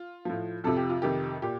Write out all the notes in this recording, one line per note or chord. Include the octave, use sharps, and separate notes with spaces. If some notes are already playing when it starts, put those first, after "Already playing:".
Already playing: F4
A2 F3
F2 C3 F3 A4
G4
F4
F2 C3 D#3 G4
A#2 G4